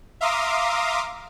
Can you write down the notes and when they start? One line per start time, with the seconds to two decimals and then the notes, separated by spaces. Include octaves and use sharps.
0.21 E5 F5 A#5 C6 D6 D#6